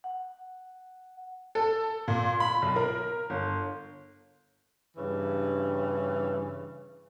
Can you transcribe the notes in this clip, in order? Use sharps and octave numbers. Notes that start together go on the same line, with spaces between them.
F#5
A4
A#2
B5
B1
A#4
G1
G2 C#3 E3